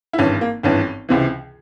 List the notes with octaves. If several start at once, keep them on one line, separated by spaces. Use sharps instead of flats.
E4
G#1 G2 E3 C#4
A#3
G#1 G2 E3 C#4
C#2 C3 E3